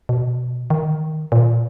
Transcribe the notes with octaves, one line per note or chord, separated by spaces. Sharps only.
B2
D#3
A#2